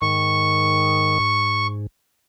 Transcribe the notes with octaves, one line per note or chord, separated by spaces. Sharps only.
G#2 D#3 C#6
G#2